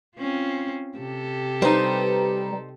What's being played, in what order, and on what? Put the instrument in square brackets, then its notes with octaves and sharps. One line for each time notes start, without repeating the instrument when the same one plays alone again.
[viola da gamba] C4 C#4 F4
C3 G4 A4
[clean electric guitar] G3 [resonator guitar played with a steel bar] D#4 C5 [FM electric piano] B4 A#5